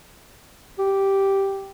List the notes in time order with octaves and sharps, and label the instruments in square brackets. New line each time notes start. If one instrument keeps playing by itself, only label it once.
[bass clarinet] G4